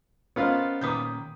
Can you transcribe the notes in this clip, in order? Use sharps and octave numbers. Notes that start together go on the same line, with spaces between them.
B3 C#4 F4 A#4 C5 D#5 F5
A#2 D#3 B4 D6 D#6 G6